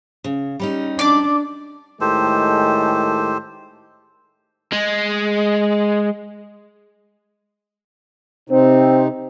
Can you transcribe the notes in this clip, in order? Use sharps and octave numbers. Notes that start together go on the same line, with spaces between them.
C#3
G3 C#4 D#4
D4 D5 D6
A2 D#3 G#3 G4 A4 C5
G#3
C3 C4 D#4